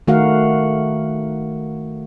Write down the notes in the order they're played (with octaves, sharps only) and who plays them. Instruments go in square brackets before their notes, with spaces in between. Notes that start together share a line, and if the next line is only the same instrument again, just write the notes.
[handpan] D#3 A3 F#4 A#4 F5 F#5